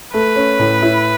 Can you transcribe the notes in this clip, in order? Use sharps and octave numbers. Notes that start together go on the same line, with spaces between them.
A3 B4
C#4
A2
E4